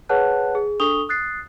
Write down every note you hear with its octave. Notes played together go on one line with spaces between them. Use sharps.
G#4 B4 C#5 F#5 A5 F#6
G#4
D4 A4 C#6 D#6 F7 G7
D#6 F#6 A6 C7